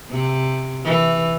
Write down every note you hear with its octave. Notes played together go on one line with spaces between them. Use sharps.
C3
E3